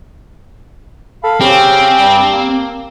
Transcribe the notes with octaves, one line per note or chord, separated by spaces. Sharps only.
A4 F5 B5
C#3 C4 C#4 G4
G2 G3
A#3